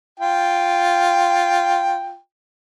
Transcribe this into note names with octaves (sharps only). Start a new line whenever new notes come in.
F4 G5